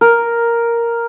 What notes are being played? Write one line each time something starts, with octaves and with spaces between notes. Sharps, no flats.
A#4